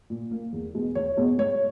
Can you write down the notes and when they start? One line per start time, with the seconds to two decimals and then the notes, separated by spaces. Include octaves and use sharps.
0.10 A#2
0.31 A#3
0.53 E2
0.75 B2 G#3 B3
0.95 E2 C#5
1.17 B2 G#3 B3
1.38 G#2 C#5